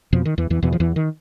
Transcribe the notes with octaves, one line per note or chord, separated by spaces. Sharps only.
F2 B2 F3
D#3
E2 E3
E2 E3
E2 B2 E3
F3
E2 E3
D#3